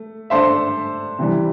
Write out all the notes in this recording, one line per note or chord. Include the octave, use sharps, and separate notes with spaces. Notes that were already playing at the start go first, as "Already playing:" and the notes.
Already playing: A3
A3 D4 A4 C5 E5
C3 E3 G3